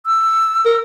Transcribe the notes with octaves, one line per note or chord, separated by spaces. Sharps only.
E6
A#4